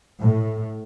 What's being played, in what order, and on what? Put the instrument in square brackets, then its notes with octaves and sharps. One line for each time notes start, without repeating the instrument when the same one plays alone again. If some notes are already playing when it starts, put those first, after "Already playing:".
[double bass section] A2